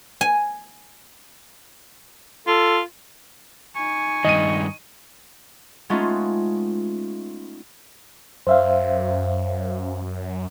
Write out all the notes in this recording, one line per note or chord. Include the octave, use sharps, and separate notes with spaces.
G#5
F4 A4
D#4 G#5 C#6
G2 D#3 D#5 D#7
G#3 A3 B3 C#4 D#4 F4
F#2 C5 E5 F5